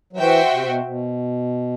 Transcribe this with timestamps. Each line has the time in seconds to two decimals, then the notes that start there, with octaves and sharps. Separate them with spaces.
0.13 F#3
0.17 E3 F#4 C5 E5 G5
0.52 C3
0.63 B2
0.85 B2